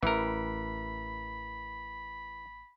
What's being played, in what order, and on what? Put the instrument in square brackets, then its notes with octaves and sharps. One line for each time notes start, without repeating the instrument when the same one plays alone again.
[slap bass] A1 [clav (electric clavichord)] E3 A#4 [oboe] B5